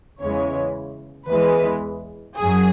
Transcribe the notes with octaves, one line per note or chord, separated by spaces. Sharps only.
E2 C#3 E3 G#3 C#5
E2 E3 G#3 B4
F#2 F#3 G#4